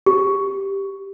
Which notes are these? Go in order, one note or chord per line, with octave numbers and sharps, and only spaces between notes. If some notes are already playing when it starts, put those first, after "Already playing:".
G4